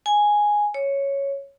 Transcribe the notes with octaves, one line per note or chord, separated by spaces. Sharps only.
G#5
C#5